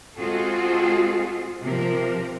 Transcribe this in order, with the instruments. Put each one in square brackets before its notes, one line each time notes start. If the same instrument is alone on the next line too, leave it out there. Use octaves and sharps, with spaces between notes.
[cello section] G#3 C4 F4 F#4 G#4 A4
C3 F3 A#4